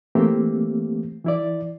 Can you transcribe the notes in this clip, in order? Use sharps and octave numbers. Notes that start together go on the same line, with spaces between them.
E3 A3 A#3 C4 G4
E3 E4 D5